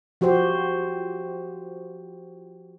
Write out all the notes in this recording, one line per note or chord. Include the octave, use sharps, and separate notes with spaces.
F3 F#4 G4 C5